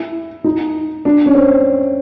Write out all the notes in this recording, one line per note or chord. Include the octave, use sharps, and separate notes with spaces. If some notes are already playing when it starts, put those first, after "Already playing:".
Already playing: E4
D#4
D4
C#4
C4